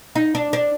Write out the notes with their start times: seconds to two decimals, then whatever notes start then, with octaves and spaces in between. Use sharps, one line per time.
0.15 D#4
0.35 D4
0.53 D4